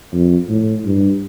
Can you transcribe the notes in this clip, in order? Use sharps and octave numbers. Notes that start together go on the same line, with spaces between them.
F2
A2
G2